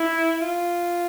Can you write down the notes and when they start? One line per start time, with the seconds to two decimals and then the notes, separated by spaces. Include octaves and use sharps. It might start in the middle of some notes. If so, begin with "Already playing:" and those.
Already playing: E4
0.42 F4